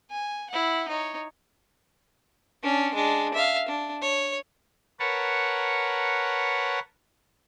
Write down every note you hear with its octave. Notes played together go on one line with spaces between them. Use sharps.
G#5
E4 F#5
D#4 C#5
C#4 D4
G#3 D4
E5 F5
D4
C#5
A#4 B4 C#5 F#5 A5